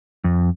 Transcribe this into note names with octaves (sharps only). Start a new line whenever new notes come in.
F2